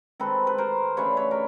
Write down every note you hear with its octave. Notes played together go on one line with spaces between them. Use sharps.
D#3 G#3 C4 A4 B4
B4
A#4 C5
C#3 E3 A3 D4 B4 C#5
B4 C#5
A#4